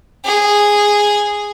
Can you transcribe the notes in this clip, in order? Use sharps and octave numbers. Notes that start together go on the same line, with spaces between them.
G#4